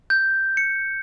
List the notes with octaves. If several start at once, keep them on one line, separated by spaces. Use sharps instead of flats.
G6
C#7